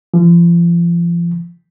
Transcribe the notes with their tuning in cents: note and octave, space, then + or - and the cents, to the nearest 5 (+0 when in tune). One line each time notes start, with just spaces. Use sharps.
F3 -35